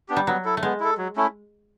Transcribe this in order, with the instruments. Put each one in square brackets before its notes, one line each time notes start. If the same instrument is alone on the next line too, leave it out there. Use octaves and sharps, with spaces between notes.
[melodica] B3 D4 G4
[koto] G3
[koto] F#3 [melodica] B3
[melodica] E4 A4
[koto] A3
[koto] G#3 [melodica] B3
[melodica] E4 A4
F#3
A3 C#4 E4